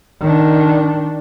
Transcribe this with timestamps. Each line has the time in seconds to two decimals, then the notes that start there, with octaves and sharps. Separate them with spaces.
0.20 D#3 D4